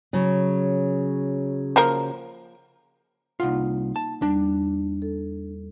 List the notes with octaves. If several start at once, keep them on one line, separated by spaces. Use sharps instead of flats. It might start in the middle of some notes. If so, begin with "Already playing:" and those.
C#3 F#3
F3 A#3 A#4
C2 A#3 D#4 F4 F#5
A5
E2 G3 D4
A4